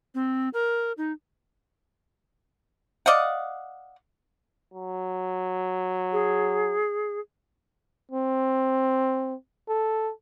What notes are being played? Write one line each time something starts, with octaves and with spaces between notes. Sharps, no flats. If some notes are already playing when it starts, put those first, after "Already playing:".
C4
A#4
D#4
D5 D#5 F5 F#5
F#3
G#4
C4
A4